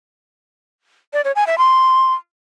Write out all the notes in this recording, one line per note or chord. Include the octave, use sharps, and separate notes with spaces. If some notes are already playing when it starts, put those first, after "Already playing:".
D5
C#5
G#5
E5
C6